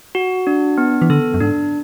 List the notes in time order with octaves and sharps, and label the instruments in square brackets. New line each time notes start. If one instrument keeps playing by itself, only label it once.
[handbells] F#4
D4
B3
[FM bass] E3
[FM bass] D3 [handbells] A4
[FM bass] F#2
[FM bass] G#2 [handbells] D4